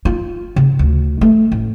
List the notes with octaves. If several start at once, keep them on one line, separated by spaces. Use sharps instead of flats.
F4
C#3
D2
A3
A1